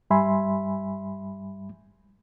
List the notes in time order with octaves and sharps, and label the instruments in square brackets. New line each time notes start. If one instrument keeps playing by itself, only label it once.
[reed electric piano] G2 G3 E5 G#5 B5 C6